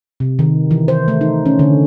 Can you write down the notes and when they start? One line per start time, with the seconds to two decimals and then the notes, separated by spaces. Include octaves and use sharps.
0.20 C3
0.39 D#3
0.71 E3
0.88 C5
1.08 A3
1.21 D#4
1.46 C#4
1.59 D3